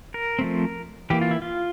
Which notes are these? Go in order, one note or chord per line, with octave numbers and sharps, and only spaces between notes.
A#4
F3 A3 C4
E3 A#3 G4
F4
E4
F4